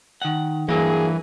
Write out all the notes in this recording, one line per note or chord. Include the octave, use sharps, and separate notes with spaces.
D#3 F#5
G2 E3 F#3 A#3 G#4